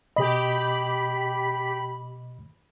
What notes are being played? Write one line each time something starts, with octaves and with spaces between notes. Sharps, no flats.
B2 G4 D#5 B5